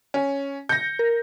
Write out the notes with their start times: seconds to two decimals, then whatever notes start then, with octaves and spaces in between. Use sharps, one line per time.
0.14 C#4
0.69 G6 A#6 C#7
0.99 A#4